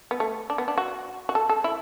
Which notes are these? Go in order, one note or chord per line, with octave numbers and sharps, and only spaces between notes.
B3
A3
D4
B3
D4
F#4
F#4
A4
A4
E4